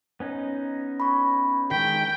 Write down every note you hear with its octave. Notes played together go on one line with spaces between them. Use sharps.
B3 C#4 D#4
B5 C#6
D#3 G#3 G5 B6